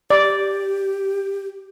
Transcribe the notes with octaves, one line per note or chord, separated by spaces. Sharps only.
G4 D5